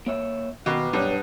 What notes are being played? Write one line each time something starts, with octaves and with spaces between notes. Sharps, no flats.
A#3 C#5 E5
B2 D#3 A#3 G4 B4
B1 G2 B3 D4 B4 C#5